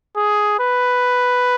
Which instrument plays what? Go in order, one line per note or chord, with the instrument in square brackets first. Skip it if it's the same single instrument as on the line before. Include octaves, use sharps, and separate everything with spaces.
[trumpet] G#4
B4